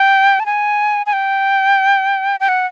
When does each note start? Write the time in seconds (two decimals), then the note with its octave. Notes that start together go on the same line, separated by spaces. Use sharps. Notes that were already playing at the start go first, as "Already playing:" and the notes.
Already playing: G5
0.40 A5
0.46 G#5
1.06 G#5
1.13 G5
2.40 G5
2.48 F#5